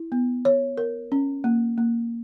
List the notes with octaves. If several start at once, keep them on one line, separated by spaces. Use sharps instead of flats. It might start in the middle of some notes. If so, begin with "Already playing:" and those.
Already playing: E4
B3
C#5
A#4
C#4
A#3
A#3